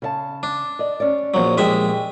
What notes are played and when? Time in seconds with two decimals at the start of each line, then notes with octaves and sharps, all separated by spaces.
0.02 C#3 E5 A5
0.43 D4
0.79 D5 D#5
1.00 C#4 D5
1.34 A#1 F#3
1.57 A#1 G#3 G4 G#4 E5 G5